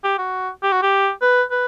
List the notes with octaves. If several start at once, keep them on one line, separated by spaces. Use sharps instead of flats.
G4
F#4
G4
F#4
G4
B4
B4